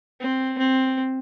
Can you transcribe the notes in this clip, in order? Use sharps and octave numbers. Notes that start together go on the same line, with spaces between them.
C4
C4